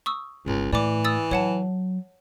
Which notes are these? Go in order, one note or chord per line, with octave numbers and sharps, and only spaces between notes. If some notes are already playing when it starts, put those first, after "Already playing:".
C#6 D#6 E6
G1 C#2 G#3
A2 E3 D5 D6
D#6 E6 A6
F#3 C#5 F#5 A5